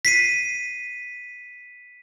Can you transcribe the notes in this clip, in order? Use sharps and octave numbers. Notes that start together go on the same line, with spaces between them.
B6 C7 D#7